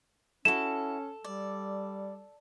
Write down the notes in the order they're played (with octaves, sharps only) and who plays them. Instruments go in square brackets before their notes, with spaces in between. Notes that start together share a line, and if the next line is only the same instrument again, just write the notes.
[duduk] C#4 [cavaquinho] E4 F#4 [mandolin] A4 [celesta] E7
[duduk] G3 [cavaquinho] D5